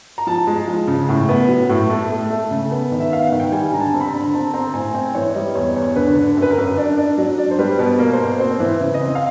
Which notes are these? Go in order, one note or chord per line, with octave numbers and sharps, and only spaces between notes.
A#5
F3 A5
G#3
F3
C#3
A2
B3
F#3
A2
A3
A3
A3
C#3
B3
D#3
E5
B3 F5
F#5
D#3
G5
G3 G#5
D3 A#5
A5
C4
B5
A#5
D3
A#5
C4 A5
C4 A#5
A2 G#5
C4 G5
E3 C#5
D5
G3 D#5
E2 C#5
E2 C#5
D3 B4
D3
F#2
B4
A#4
F#2
D4
D4
F#3
D4
C5
G3 B4
B2
A#3
C5
B2
C4 C5
E3
C#3
D#5
C4
F5